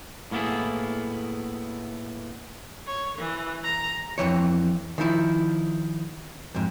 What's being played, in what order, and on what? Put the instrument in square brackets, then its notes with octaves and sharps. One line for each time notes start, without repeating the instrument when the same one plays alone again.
[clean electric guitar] A2 A#3 B3 E4 G#4
[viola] C#5
E3
A#5
[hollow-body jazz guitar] F2 G#2 E3 C#5
D#3 F3 E4
F2 G#2